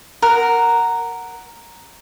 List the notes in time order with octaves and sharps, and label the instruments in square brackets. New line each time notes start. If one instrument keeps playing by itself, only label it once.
[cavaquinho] A#4 F#5